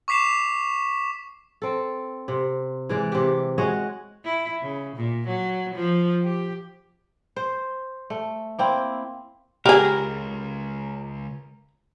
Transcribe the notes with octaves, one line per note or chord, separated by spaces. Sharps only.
C#6 D6 B6 C7 E7
C4 A4
C3
E3 G#3 D5
C3 G4
G#3 F#4 C#5 D#5
E4
C#3
A#2
F#3
F3
G4
C5
A3
A#3 C4 E4
C#2 G4 G#4 A#4